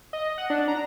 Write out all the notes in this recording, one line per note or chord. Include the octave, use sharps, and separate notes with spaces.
D#5
F#5
D4
A#5